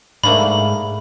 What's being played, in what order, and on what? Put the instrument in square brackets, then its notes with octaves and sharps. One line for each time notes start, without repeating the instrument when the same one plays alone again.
[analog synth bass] G#2 [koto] A3 A#3 D4 [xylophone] B5